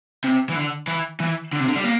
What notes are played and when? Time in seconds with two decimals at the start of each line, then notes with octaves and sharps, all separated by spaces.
0.24 C3
0.49 E3
0.56 D3
0.88 E3
1.20 E3
1.53 D3
1.60 C3
1.68 D3
1.76 G3
1.84 A#3